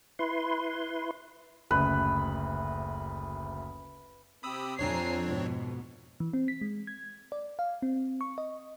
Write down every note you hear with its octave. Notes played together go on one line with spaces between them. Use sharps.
E4 B4 C6
F#1 D2 B4
C3 G4 B5 D#6 E6
F2 C4 D4 C#5 G#5 A#5 C7
G#2 B2
E3
C4
B6
G#3
G#6
D5
F5
C4
C#6
D#5